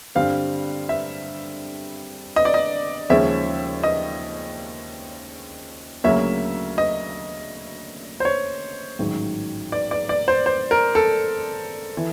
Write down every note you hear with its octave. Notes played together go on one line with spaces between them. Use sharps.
G2 D3 G3 C4 F5
E5
D#5
D5
D#5
D#2 C#3 F3 G#3 C#4 E5
D#5
D2 C#3 F#3 A#3 C#4 E5
D#5
C5
C#5
A1 G#2 D#3 F#3
D5
D5
D5
C5
C5
A#4
A4
E3